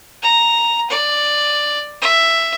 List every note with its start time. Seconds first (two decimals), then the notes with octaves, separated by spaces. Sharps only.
0.22 A#5
0.90 D5
2.02 E5